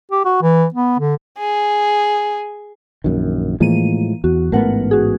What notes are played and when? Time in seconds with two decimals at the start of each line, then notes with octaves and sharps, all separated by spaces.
0.12 G4
0.25 F#4
0.42 E3
0.74 B3
0.99 D3
1.38 G#4
3.04 A#1 F#2 D#3
3.60 A2 E3 F3 G#3 A#3 D#7
4.24 E2 F#4
4.52 A1 G#2 A3 B3 A#4 F#5
4.91 F#4 G#4